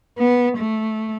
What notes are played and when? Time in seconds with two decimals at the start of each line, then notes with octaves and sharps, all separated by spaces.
0.18 B3
0.57 A3